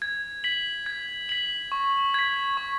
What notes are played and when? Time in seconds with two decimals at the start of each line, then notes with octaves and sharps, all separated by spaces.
0.02 G#6
0.44 B6 F#7
0.86 G#6
1.29 B6 F#7
1.72 C#6
2.14 G#6 B6
2.57 C#6